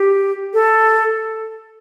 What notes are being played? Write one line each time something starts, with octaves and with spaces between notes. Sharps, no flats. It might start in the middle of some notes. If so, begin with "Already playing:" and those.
Already playing: G4
A4